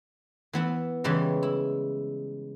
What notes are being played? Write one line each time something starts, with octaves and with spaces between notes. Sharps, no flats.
E3 B3 E4
C#3 E3 G3 G#3 E4
E4